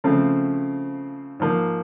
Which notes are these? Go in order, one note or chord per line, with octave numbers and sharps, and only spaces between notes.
C#3 F3 A3 C4
G#2 F3 A#3